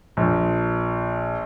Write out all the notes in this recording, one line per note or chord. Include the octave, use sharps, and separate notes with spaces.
A#1